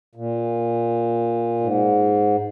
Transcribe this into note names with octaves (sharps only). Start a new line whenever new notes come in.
A#2
G#2